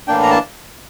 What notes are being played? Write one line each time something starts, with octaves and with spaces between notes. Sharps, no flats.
A2 E3 A#3 D4 G5
A#5
A5